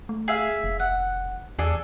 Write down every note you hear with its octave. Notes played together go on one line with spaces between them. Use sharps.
A3
G#4 E5 F5
F1
F#5
E2 D4 G#4 A4